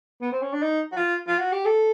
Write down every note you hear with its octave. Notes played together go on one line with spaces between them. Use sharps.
B3
C4
C#4
D4
D#4
F#4
F4
F4
F#4
G4
A4